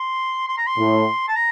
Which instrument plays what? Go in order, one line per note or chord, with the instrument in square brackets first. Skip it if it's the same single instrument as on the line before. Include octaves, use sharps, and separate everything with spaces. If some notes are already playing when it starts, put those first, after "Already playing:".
Already playing: [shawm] C6
C6
A#5
C6
[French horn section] A2
[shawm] A5
A#5